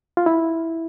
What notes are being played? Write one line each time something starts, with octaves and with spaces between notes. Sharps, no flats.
F4
E4